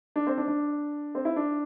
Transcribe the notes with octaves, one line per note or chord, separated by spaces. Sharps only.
D4
C4
D4
D4
C4
E4
D4